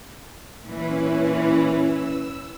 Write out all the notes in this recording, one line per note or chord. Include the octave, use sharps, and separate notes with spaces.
A#2 E3 C#4 E4 B4
E6